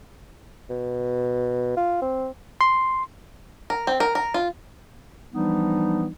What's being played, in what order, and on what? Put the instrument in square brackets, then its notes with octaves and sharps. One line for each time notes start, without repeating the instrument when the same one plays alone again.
[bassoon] B2
F4
C4
[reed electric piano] C6
[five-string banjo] A#4
C4
A#4
A#4
F4
[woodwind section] E3 F3 G3 B3 D4 D#4